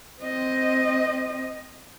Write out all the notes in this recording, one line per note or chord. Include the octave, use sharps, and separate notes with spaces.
C4 D#5